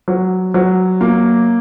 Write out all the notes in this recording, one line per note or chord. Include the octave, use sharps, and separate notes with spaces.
F#3
F#3
A#3